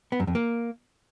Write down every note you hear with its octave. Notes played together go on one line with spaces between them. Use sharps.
B3
F#2
F2
A#3